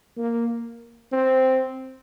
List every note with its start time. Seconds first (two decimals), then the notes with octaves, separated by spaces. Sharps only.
0.17 A#3
1.12 C4